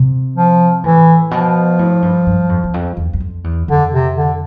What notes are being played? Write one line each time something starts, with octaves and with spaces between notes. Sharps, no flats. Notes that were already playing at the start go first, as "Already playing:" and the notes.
Already playing: C3
F3
A2 E3
B2 F3
A2
G2
G2
F2
E2
F2
E2
E2
F2
E2
F2 D3
C3
D3